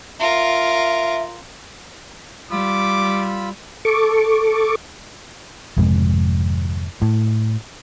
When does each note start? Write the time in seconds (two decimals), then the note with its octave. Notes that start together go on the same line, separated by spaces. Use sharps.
0.20 F4 A#4 E5
2.51 G3 F4 B5 D6 E6
3.85 A4 C#6 D6
5.77 G#1 F2 C3 G#3
7.02 A2